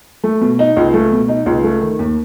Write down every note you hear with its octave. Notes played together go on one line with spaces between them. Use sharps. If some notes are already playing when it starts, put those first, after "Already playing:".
A3
B2
D#4
C#2
A3
B2
D#4
C#2
A3
D#3
D#2